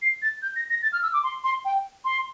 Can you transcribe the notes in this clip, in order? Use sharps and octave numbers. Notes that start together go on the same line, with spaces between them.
C7
A6
G6
A#6
A#6
A6
F6
E6
D6
C6
C6
G5
C6